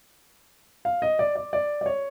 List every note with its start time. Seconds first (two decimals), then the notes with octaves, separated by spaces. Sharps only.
0.85 F5
1.02 D#5
1.19 D5
1.36 D5
1.53 D5
1.81 D5
1.86 C#5